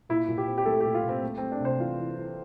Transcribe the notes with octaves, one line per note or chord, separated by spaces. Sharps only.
A#2 E4
A#2
G4
C4
G4
A3 A4
A#2 G4
F4
A#2
C4
A3
A3 C4
D4
C3 C5
E3 F4
E3
E3